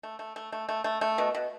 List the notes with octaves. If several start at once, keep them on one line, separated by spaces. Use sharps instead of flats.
A3
A3
A3
A3
A3
A3
A3
B2
B2